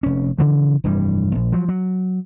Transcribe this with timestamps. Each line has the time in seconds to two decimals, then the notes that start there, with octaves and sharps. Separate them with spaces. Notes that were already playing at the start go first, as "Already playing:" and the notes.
0.03 F1 C#4
0.38 C#3 E3 F3
0.84 F1 G2 E3 G3
1.35 A#1
1.52 F3 F#3
1.69 F#3